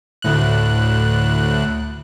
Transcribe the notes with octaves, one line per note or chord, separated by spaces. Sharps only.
D2 A2 F#6